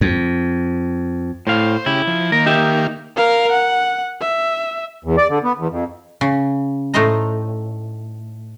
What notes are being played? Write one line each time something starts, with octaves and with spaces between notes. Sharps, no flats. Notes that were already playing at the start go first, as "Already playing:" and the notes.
F2
A2 C5 F5
C#3 E4 G4
F3
D#3 A#3 A#4
D#4 G4 E5
A#4 F5
F#5
E5
E2
D5
D3
B3
E2
F2
C#3
A2 A3 D#4 C5 D#5 A#5